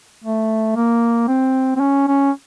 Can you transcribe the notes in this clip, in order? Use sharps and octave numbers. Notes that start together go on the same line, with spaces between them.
A3
A#3
C4
C4
C#4
C#4